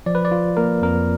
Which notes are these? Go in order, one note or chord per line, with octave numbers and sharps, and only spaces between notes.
F3 D5
B4
D5
F4
A#3 A#4
F2 A#4